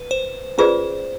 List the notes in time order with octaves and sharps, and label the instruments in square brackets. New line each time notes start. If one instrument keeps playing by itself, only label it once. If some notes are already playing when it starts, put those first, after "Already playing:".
Already playing: [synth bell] B4
C5
[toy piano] C#4 F4 G#4 B4 D5 [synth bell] C5